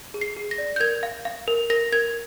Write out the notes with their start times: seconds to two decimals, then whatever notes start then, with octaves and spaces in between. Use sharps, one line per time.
0.14 G#4
0.21 C7
0.37 G#4
0.51 A#6
0.58 D5
0.76 G6
0.80 A#4 G#6
1.03 F5
1.25 F5
1.48 A#4
1.70 A#4 A#6
1.92 A#4 G#6